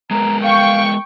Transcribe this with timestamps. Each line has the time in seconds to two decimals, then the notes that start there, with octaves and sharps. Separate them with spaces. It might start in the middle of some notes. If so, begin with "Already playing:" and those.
0.11 G#3 B3 A#4 A#5
0.43 F5 G5 C#6